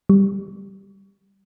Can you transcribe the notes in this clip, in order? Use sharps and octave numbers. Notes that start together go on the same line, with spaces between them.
G3